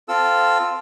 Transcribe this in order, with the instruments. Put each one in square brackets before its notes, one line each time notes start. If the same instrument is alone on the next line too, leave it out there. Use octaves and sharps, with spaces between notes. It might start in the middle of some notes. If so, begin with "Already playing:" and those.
[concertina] C4 F4 A4 E6